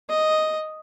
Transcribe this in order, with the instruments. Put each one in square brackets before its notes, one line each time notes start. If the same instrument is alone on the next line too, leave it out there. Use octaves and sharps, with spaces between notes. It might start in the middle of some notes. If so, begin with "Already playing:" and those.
[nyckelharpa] D#5